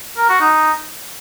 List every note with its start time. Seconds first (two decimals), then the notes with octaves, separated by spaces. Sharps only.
0.17 A#4
0.29 F#4
0.40 D#4